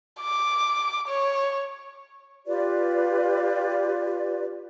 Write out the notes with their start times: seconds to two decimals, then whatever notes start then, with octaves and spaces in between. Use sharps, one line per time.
0.21 D6
1.08 C#5
2.47 F4 G4 B4 D5